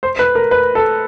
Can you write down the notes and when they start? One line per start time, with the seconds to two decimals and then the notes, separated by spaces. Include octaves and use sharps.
0.03 C5
0.19 B4
0.35 A#4
0.51 B4
0.75 A4